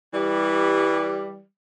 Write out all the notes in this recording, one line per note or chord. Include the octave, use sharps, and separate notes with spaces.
E3 G3